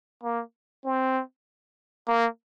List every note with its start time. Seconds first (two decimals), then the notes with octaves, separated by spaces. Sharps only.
0.24 A#3
0.85 C4
2.08 A#3